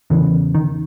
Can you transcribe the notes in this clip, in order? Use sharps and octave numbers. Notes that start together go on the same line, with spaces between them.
E2 C#3 E3
D#3